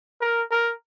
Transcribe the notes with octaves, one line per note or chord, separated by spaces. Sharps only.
A#4
A#4